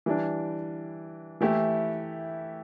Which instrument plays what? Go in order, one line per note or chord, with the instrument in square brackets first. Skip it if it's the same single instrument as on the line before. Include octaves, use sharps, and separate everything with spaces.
[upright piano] E3 G3 D4
E3 A3 E4 G4